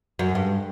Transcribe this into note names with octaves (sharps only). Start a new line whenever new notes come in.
F#2
G2